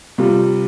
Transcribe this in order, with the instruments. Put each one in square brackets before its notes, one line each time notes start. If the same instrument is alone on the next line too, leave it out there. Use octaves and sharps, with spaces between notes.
[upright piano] C3 G3 F4